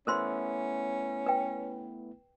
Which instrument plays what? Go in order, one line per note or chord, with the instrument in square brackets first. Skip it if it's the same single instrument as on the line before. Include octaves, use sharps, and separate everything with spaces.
[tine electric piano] A3 B3 E4 [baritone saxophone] C#4 [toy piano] A#4 C5 C6
[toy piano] B4 G5